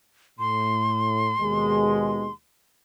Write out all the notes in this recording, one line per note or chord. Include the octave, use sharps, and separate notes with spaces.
A2 C6
D#2 B2 G#3